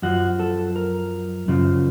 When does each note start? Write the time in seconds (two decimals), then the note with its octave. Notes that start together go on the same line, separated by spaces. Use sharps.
0.02 F#2 F3 F#4
0.40 A4
0.76 A#4
1.48 F#2 C#3 F3